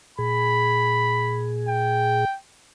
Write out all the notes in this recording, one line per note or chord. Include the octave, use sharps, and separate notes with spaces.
A#2 G#4 B5
G5